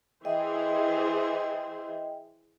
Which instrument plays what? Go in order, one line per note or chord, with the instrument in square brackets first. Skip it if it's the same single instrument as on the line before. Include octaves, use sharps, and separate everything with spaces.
[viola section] E3 G#4 C5 [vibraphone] D#5 E5 G5